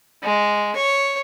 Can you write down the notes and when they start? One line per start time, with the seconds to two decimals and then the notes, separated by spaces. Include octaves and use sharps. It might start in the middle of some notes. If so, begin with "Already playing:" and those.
0.23 G#3
0.76 C#5